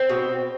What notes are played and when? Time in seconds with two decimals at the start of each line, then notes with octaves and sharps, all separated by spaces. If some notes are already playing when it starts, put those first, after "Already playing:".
Already playing: C4
0.10 B2